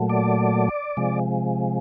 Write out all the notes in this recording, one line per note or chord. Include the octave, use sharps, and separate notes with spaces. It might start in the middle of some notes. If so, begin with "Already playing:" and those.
Already playing: A#2 F#3 A3
D5
C3 F3 G#3